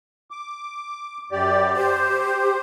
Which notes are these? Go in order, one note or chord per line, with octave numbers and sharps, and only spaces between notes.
D6
F#2 G4 D5
G4 C5